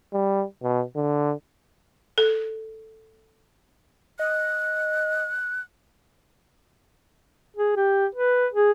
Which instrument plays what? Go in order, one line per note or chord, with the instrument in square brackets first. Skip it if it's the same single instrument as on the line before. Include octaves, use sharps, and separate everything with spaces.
[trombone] G3
B2
D3
[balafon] A4
[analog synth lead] D#5 [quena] F#6
[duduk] G#4
G4
B4
G#4